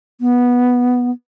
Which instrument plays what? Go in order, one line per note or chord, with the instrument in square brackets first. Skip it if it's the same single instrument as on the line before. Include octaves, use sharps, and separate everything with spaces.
[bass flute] B3